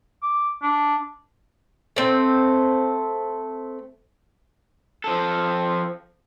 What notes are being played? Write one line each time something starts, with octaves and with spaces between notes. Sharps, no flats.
D6
D4
A3 C4
F3 A4